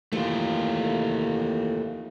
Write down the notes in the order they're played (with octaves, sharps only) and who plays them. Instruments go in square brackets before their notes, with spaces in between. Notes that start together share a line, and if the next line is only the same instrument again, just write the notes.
[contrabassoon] D#2 [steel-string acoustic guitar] E3 [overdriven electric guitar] A3 F4